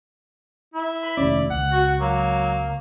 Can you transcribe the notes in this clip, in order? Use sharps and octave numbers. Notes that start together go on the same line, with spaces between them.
E4
B5
F1 D#2 C#4 D5
C#2 F#5
F#4
F#3 A#3